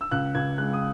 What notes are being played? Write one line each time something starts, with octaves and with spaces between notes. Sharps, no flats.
E6
C#2 F#6
C#2 G#6
G#3 F#6
D#6